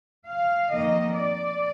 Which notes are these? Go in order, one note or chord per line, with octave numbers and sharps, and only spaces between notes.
F5
F2 D#3 A#3 D#5
D5